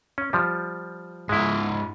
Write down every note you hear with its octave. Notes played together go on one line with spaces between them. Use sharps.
C#4
F3 G3
G#2 G#3 E4 F4